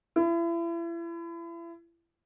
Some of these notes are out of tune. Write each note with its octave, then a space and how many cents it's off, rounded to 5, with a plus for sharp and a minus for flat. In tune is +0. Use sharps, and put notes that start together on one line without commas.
E4 +35